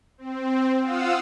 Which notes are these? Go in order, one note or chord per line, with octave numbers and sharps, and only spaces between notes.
C4
F4 F5 F#5 D#6 E6